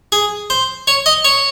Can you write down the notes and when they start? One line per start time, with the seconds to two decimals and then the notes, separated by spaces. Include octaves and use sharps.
0.12 G#4
0.50 C5
0.87 C#5
1.06 D#5
1.25 C#5